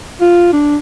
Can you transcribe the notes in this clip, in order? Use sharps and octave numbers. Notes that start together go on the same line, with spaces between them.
F4
D4